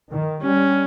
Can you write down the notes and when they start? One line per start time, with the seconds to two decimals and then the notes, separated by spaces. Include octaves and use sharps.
0.10 D#3
0.43 G3 C#4